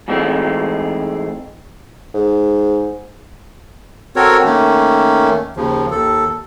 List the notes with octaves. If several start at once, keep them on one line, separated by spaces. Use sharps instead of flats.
G#2 E3 G#3 A3 C4
G#2
C4 F#4 A4 A#4 C#5
D#3 A3 A#3 C#4
D#2 C#3 F3
D#2 A4